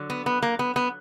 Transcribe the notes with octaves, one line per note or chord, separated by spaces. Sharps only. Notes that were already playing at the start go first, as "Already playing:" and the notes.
Already playing: D3 F#3
B3
B3
A#3
B3
B3